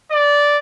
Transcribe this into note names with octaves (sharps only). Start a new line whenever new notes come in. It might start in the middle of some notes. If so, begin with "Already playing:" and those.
D5